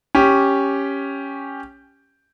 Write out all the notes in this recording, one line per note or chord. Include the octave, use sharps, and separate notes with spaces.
C#4 G4